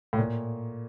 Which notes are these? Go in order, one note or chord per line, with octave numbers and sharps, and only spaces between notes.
A2
A#2